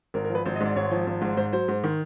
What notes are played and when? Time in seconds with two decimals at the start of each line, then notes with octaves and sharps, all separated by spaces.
0.14 G#1 A#4
0.24 A#4
0.30 F3
0.35 B4
0.45 G#1 C5
0.56 D#5
0.60 G#2
0.66 D5
0.76 G#1 C#5
0.91 F3
1.07 G#1
1.21 G#2
1.37 G#2 C5
1.53 F#3 C5
1.68 G#2
1.84 D#3